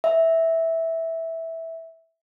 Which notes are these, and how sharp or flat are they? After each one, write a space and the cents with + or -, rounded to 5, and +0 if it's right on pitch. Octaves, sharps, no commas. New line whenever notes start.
E5 -10